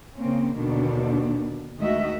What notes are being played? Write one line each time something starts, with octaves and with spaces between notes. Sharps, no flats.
C#3 A#3 C4 C#4
D#2 B2 D3 D#3 D4
D2 D#3 G#3 F#4 D#5 E5